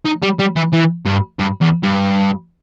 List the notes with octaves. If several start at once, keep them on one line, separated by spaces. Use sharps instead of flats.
D#4
G3
G3
E3
E3
G2
G2
E2
G2